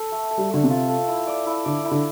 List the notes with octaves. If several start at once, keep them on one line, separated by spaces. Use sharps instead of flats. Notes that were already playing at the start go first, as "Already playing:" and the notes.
Already playing: A4
A3
A4
G3
D3 A3
C3
F4
A4
E4
D5
E4
D3 D5
E4
D3